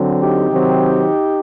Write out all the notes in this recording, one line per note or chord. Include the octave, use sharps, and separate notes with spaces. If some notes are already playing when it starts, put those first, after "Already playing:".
Already playing: D3 F#3 C4
D#4 G4
C3 D#3 F#3 C4